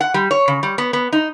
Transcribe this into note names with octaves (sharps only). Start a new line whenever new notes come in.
F#5
G3
C#5
C#3
G3
B3
B3
D#4